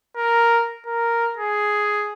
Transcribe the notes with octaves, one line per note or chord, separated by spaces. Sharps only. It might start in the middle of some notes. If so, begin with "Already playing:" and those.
A#4
A#4
G#4